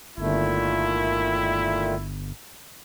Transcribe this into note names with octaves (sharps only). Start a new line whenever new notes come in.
G1 A#2 D#3 A3 E4